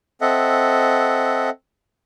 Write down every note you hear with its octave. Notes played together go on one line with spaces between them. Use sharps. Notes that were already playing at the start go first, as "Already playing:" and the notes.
C4 A4 D#5 E5 F#5